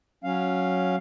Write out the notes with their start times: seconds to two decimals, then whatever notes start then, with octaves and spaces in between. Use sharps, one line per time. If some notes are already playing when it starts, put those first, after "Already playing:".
0.24 F#3 C#4 F5